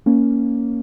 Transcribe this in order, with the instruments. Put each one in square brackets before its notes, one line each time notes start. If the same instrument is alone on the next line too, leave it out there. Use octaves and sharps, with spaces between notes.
[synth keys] A#3 C#4